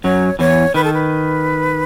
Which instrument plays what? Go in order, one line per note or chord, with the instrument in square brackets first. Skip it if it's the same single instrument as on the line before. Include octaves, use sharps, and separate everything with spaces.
[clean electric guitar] F#2 F#3 [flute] C#5
[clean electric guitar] E2 E3 [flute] C#5
[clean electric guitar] D#3 [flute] B4
[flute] A4
B4